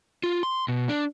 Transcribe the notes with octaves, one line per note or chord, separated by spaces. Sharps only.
F4
C6
B2
D4